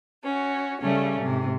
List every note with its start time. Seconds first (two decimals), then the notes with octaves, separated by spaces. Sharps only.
0.23 C#4 F#4
0.80 C#3 G3 A3 C#4
1.21 G#2 C3